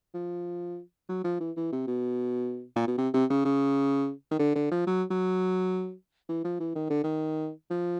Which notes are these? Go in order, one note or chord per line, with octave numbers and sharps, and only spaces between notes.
F3
F#3
F3
E3
E3
C3
B2
A#2
B2
C3
C3
C#3
C#3
D#3
D3
D3
F3
F#3
F#3
E3
F3
E3
D#3
D3
D#3
F3